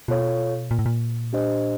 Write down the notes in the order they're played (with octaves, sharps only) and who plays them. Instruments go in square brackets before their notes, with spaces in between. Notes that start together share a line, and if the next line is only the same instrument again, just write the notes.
[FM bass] B2 [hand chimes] F4 A4 C#5 F5
[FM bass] A#2
A2
A#2
[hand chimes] D4 G4 C5 D#5